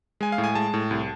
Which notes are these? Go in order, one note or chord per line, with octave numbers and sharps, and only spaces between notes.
G#3 G#5
F5
A2
G#5
G#3 A5
A2
C2